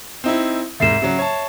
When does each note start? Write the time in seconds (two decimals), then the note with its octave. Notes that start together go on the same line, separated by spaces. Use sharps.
0.24 C4 D#4 E4
0.80 C2 G#2 E5 C7 E7
1.02 C#3 F#3
1.19 C#5 A5